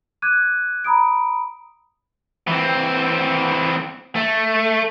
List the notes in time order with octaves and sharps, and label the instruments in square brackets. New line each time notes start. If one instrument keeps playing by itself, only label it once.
[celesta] D6 F#6 G#6 D#7
A#5 B5 D#6 D7
[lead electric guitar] E3 C4
A3